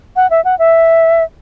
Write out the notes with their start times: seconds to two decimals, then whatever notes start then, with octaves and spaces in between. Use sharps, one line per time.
0.16 F#5
0.30 E5
0.45 F#5
0.59 E5